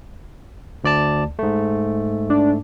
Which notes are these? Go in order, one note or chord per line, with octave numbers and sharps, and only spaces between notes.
D2 D5 A5
G#2 A3
D4